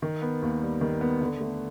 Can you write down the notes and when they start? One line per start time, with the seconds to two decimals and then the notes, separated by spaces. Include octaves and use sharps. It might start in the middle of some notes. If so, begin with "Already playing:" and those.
0.02 D#3
0.22 B3
0.42 D#2
0.62 G3
0.81 D#3
1.01 B3
1.21 D3
1.41 A3